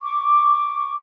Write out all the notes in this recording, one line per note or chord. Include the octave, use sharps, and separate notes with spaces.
C#6 D6